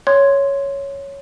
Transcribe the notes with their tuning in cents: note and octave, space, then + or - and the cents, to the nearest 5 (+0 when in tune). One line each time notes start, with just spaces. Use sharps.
C#5 +0 C6 +0